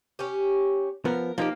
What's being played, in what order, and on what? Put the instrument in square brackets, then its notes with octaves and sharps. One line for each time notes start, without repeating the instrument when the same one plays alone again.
[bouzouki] C#4 G4
[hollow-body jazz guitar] F3 B3 [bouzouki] A#4
[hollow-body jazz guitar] F3 D#4 G4 [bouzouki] A#3